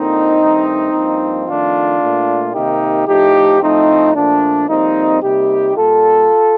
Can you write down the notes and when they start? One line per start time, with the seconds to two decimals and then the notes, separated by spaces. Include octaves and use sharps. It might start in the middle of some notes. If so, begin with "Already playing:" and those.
Already playing: F2 D3 F3 A#3 C4 D#4
0.40 G2 D#3 A3
0.92 G2 F3 A#3
1.46 F2 D#3 A3 D4 F4
2.00 A#2 A3
2.53 C3 D#3 A#3 D#4 G4
3.07 A2 F3 A3 D#4 G4
3.61 A2 F3 A3 C4 D#4
4.15 A#2 F3 A3 D4
4.68 F2 C3 G3 A#3 C4 D#4
5.21 C3 G3 A#3 D#4 G4
5.75 A#2 G3 A#3 F4 A4